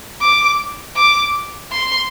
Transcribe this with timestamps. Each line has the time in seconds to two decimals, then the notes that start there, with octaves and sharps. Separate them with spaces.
0.21 D6
0.96 D6
1.72 C6